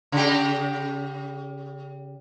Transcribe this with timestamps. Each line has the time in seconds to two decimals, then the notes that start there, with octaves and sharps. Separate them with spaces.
0.12 C#3 G4